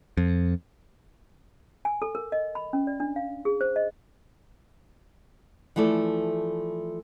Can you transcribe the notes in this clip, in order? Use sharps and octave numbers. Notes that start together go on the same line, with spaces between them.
F2
G#5
A4
A#4
D#5
B5
C#4
D5
D4
F5
G#4
C5
D#5
E3 F3 A3 A4 D5